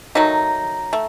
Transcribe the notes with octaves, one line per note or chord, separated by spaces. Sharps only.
D#3 F#3 A3 D#4
A3